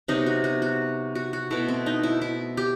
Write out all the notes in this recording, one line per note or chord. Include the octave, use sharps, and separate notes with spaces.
C3 F#3 B3 D#4
F#4
F#4
F#4
F#4
F#4
B2 A3 E4
C4
D#4
E4
E4
G4